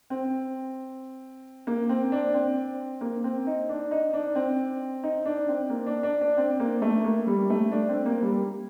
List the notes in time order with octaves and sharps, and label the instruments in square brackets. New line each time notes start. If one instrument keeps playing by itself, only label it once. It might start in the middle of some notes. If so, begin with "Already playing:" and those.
[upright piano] C4
A#3
C4
D4
C4
A#3
C4
D#4
D4
D#4
D4
C4
D#4
D4
C4
A#3
D4
D4
D4
C4
A#3
A3
A#3
G3
A3
D4
C4
A#3
G3